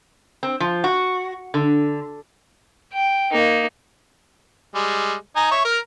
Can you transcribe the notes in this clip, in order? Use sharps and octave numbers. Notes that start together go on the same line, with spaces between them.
C4
F3
F#4
D3
G5
A#3 D#4
G3 G#3
D#4 G#5 A#5
C#5 E5
A#4 F6